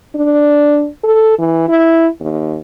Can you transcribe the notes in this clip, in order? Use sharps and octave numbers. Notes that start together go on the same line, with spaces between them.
D4
A4
E3
E4
D#2